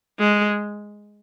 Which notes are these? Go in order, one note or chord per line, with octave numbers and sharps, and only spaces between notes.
G#3